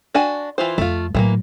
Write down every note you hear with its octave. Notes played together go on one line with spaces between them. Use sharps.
D4 F#4 G#5
E3 F4 C5
F2 A3 F4
A2 E3 F#3 A3 A#3